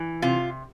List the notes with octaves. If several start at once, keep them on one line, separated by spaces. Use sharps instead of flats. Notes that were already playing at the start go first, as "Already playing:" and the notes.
Already playing: E3
C3 F4